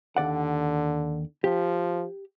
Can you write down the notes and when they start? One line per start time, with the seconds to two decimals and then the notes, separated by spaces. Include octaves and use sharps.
0.17 D#2 D3 D5 F#5
1.44 F3 G4